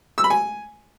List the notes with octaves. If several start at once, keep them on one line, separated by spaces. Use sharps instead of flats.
E6
B5
G#5